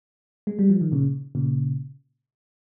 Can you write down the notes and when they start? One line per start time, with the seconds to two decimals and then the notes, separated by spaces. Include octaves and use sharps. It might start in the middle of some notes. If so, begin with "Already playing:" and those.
0.47 G#3
0.59 G3
0.70 F3
0.81 D#3
0.92 A#2 C#3
1.35 A#2 C#3